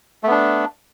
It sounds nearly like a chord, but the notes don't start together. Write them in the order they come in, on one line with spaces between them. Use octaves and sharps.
A3 B3 D4